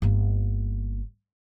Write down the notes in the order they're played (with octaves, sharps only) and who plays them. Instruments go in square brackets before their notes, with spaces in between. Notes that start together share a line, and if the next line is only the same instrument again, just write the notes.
[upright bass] G1 A#3